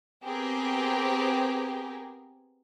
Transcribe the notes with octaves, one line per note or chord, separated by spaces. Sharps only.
B3 C4 G4 G#4 A#4